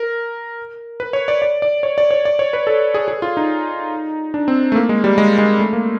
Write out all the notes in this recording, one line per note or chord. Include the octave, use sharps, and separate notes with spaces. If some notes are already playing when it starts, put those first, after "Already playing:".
Already playing: A#4
B4
C#5
D5
D5
D5
C#5
D5
C#5
D5
C#5
B4
A4
G#4
G#4
F4
D#4
D4
C4
A3
A#3
G#3
G3
G#3
G#3
A3
A#3